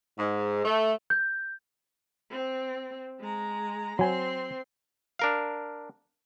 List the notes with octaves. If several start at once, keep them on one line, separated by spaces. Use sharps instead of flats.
G#2
A3
G6
C4
G#3 A#5
F#3 C4 G#5 C6
D4 A#4 F5